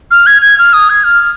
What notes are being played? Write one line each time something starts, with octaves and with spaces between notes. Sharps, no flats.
F6
G#6
G#6
F6
D#6
G#6
F6